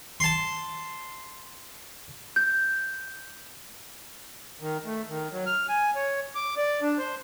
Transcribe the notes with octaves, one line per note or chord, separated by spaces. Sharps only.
A5 C6
G6
D#3
A3
D#3
F#3
F6
G#5
C#5
D6
D5
D4
C5